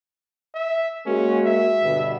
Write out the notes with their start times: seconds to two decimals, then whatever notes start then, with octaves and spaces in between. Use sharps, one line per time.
0.54 E5
1.06 G#3 A#3 C#4 F#4
1.46 E5
1.83 G2 B2 D3